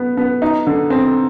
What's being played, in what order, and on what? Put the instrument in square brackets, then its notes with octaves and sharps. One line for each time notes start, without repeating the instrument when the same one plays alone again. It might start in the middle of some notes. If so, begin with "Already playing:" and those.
Already playing: [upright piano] B3
B3
D#4
D3
C4